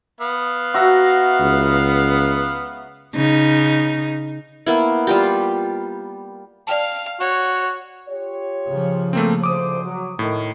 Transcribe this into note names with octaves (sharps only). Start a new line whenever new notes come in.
B3 F5
F#4 E5 A#5
C#2
C#3 D#4
A#3 B3 E4
G3 F4 G4
D5 F5 G5 A5 F6
F#4 C#5
F4 G4 C#5
C#3 F3
A3 A#3 C4
D2 C5 D6 D#6
F#3
A2 D#3 A3